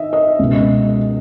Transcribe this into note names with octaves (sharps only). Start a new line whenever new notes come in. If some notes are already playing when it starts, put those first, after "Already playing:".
Already playing: D#3 D#5 E5
D#5
C#2 B2